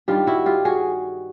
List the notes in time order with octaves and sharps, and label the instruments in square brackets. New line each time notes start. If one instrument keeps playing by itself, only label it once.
[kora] G2 D#3 G3 F4 G4
E4 F#4
F4 G4
F#4 G#4